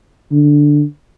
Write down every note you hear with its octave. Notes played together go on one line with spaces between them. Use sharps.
D3